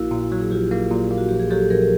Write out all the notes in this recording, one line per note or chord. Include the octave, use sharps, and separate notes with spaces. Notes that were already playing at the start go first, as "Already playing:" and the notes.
Already playing: A#1 A#3 E4 F#4
A#2
F#3
G#4
A#1 F4 G4
A#3
A#2
A#3
F#4
A#1 G4
G#4
F#3 G4 A4
A#1 G#4 A#4